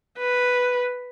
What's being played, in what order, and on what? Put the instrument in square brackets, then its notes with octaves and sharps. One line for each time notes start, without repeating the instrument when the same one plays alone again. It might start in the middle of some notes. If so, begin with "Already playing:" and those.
[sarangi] B4